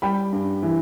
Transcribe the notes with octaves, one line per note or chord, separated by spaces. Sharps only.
G3 G5 B5
G2
E3